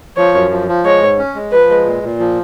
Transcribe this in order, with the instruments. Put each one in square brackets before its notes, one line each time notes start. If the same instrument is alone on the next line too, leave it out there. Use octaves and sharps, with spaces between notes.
[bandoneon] F3 [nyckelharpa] C#5
[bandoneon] F#2
F3
F3
[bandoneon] G#3 [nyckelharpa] C#5
[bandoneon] G#2
C#4
G#3
[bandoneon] F3 [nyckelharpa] B4
[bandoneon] G#3
A#2
A#2
F3